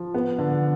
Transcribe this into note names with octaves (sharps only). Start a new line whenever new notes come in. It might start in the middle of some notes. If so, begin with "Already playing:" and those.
Already playing: F3
B3
D3